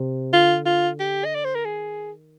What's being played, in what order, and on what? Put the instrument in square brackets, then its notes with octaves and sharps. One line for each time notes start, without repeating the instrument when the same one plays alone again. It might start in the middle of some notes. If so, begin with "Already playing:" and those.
Already playing: [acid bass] C3
[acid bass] D3 [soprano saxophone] F4
[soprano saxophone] F4
G4
D#5
D5
C5
A#4
[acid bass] D#3 [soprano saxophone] G#4